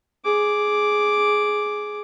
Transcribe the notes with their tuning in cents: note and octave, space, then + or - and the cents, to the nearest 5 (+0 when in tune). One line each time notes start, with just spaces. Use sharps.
G#4 +10 D6 +0